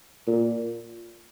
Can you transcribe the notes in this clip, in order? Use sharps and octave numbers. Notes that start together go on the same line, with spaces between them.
A#2